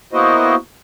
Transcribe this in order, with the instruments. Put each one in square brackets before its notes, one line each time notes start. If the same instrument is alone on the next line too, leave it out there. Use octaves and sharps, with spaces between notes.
[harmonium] A#3 B3 E4 F#4 C5 D#5